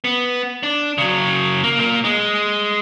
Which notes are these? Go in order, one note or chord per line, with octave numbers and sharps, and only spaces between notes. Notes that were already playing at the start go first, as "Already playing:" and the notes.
B3
D4
C#3 F#3
A#3
A#2 A#3
G#3